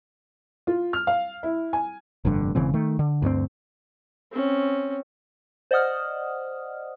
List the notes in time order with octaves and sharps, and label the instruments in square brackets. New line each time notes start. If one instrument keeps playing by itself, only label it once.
[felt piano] F4
F6
F5
E4
G#5
[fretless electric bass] F1 G2 D3
E1 C#3 E3 C4
D#3 A3
D3
D2 G2 A3 C4
[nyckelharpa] C4 C#4
[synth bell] C5 D5 D#5 F#5 D#6 F6